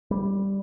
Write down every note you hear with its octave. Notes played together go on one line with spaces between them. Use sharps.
G3